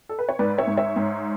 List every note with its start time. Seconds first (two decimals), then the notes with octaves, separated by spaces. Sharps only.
0.09 A4
0.19 B4
0.29 C#5
0.39 G#2 B4 D5
0.58 C#5 E5
0.67 G#2
0.77 C#5 E5
0.96 G#2